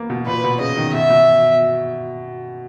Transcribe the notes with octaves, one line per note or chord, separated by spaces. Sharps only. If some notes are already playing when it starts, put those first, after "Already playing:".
Already playing: A#3 B3
B2
A#2 B4
B2
C#3 D#5
D#3
B2 E5
B2